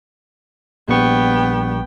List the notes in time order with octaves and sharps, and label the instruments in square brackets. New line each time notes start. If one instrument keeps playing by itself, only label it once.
[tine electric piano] A#1 G3 C#6 [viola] B3 G5